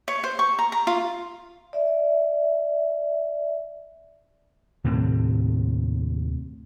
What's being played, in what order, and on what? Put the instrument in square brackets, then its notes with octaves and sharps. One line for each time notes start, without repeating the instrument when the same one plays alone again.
[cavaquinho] C#5
C5
C#6
A#5
A#5
F4
[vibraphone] D5 E5
[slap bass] D#2 A2 C3 C4